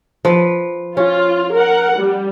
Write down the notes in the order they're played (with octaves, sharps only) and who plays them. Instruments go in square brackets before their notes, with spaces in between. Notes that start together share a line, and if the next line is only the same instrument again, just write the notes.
[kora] F3 B4
[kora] C#4 [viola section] F4
[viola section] A#4 F#5
G3